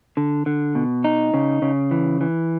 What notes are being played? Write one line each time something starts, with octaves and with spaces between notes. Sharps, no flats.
D3
D3
B2
D#4
C#3
C#3
E3
E3